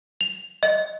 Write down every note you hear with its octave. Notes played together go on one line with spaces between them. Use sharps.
F7
D#5